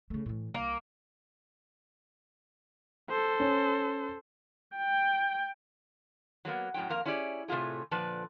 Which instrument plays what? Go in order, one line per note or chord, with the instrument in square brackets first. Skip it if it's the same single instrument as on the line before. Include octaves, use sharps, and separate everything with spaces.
[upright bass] C#3 A3
A2 E3
[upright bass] C2 [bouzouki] A#3
[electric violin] A4 C5
[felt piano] C#4
[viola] G5
[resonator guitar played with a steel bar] F#3 G3 A#3 B3
F#2 A2 F#3 C#4 G5
F2 A#3 A#4 F5
C#4 E4 G4 G#4 D5
A2 C3 A3 F4 G#4
A#2 D3 F3 B4 D5 A5